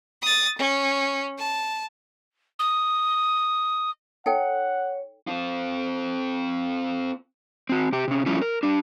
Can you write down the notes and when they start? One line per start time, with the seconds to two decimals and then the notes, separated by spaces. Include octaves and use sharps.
0.22 D#6 A6
0.58 C#4
1.38 A5
2.59 D#6
4.26 D#4 A4 C#5 F#5 G5
5.27 C4 F4
7.69 C4 F#4
7.92 C3 G4
8.08 C3 C#4
8.26 F3 G3 A3 C#4 E4 F4
8.42 A#4
8.63 D4 G4